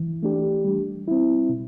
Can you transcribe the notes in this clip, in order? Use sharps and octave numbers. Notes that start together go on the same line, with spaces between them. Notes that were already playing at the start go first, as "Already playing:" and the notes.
Already playing: E3
A3 D4 G4
G3
C4 E4
B2